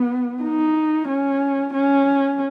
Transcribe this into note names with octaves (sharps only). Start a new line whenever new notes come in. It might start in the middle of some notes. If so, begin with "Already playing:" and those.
Already playing: B3
D#4
C#4
C#4